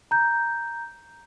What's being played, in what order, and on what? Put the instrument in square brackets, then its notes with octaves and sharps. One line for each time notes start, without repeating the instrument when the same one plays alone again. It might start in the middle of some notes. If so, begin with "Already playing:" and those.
[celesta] A#5 G6